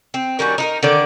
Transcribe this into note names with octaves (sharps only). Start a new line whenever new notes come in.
C4
D#3 G3 C#4 F#4
D#4 E4 A#4
D3 D#3 D5